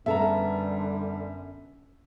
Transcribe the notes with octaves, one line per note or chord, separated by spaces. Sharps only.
F#2 D3 G3 B3 A4 E5 A#5